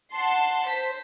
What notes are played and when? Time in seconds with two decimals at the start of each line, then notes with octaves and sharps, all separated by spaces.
0.13 F#5 A5 C6
0.67 C5 B6